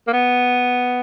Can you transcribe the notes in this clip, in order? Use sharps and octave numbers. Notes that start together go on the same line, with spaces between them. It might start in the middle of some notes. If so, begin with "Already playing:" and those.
A#3
B3